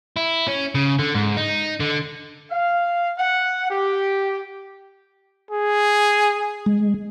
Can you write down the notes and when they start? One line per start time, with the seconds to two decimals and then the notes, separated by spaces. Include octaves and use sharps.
0.17 E4
0.48 C#4
0.75 C#3
0.99 D3
1.14 G#2
1.37 D#4
1.80 D3
2.51 F5
3.18 F#5
3.70 G4
5.51 G#4
6.66 G#3